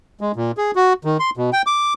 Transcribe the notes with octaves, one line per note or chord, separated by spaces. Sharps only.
G#3
A#2
G#4
F#4
D#3
C6
B2
G5
D6